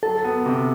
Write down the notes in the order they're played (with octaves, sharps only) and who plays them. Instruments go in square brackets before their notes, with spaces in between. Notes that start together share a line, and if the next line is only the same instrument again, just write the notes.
[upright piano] F#3 [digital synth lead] A4
[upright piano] B3
C3